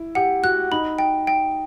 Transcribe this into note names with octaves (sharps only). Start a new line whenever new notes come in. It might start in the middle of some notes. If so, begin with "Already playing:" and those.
Already playing: E4
G4 F#5
F#4 F#6
D#4 B5
G5
G5